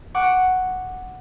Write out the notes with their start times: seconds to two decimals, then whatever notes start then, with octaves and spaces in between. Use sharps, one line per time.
0.15 F#5 C#6 D6